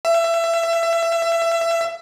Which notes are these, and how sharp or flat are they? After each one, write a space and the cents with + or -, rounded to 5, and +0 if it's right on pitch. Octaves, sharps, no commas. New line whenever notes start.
E5 +25